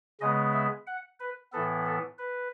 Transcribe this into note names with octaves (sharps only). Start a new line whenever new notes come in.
C#3 G#3 B3 D#5
E5
F#5
B4
A2 E3 B3 A4
A4
B4